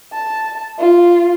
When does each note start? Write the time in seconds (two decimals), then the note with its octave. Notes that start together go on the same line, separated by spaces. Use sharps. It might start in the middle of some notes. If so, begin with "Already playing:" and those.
0.13 A5
0.79 F4